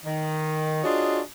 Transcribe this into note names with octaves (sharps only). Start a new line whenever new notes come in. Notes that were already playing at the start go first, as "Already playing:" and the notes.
D#3
D4 F4 F#4 G#4 C#5 D#5